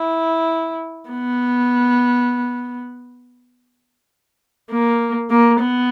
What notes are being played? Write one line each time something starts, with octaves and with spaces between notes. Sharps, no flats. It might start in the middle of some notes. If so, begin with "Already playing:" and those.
Already playing: E4
B3
A#3
A#3
B3